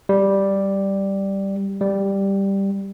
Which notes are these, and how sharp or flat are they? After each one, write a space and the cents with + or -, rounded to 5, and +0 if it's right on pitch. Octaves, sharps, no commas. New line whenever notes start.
G3 +0
G3 +5